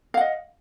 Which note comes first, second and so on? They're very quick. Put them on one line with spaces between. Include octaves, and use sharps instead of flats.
F5 F#5 D#5